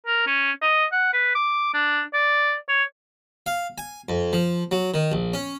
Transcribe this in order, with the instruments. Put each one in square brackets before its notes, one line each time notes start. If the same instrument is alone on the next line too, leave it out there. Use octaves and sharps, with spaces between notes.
[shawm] A#4
C#4
D#5
F#5
B4
D6
D4
D5
C#5
[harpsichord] F5
G#5
F2
F3
F#3
D#3
A#1
C#4